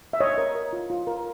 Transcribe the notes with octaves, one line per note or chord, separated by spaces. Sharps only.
E5
C#5 D#5
A#4
A#4
F4
F4
A#4